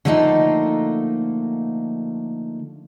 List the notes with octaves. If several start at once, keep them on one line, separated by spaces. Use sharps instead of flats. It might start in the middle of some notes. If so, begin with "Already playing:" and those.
D3 F3 A3 A#3 D#4